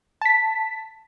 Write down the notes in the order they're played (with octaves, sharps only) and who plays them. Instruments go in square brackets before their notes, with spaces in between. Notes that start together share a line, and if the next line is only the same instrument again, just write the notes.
[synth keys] A5 B6